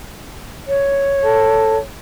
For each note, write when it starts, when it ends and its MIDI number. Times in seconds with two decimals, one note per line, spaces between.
0.67 1.79 73
1.25 1.78 69